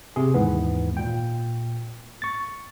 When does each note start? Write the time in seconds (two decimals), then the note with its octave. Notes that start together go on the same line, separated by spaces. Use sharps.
0.16 C3 G#4
0.34 D#2 G#2 E3 B3
0.97 A#2 G5
2.22 C#6 A6